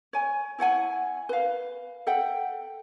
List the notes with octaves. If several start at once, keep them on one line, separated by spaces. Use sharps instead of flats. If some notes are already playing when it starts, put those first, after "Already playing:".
C#5 G#5
E4 C#5 F#5 G#5
B4 F5
A4 E5 F#5 G5